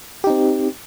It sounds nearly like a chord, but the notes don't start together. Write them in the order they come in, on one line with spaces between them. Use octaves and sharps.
G4 D#4 C4